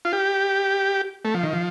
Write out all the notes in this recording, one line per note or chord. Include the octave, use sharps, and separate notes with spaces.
F4
G4
A3
F3
D#3
F3